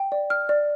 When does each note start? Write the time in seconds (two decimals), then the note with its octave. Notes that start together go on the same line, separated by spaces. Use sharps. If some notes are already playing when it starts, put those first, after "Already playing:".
Already playing: G5
0.12 D5
0.30 F6
0.49 D5